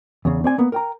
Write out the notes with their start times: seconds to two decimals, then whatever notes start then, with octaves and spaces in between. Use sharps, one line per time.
0.25 E2 C#3
0.44 C4 D5 G#5
0.58 A#3 B3
0.72 A#4 G5 A#5